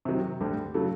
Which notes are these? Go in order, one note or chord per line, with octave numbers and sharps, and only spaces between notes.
C3 D#3 F#3
D2 D3 G3
C#3 F#3 A3